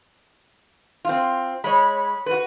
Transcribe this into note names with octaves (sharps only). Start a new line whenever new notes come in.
C4 F4
G#3 C#5 B5
F#4 B4